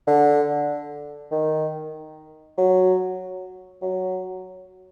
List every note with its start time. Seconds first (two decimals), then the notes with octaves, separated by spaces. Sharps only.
0.07 D3
1.32 D#3
2.58 F#3
3.82 F#3